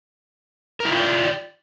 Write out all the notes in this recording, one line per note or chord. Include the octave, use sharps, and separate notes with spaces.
E4 F4 A#4 D5 G5